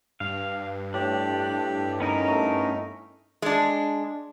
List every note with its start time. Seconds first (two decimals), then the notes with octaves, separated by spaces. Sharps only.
0.20 G2 F5
0.94 A2 D4 G4
2.00 B3 C#4 D#4 A#4
2.28 A3
3.42 G#3 D4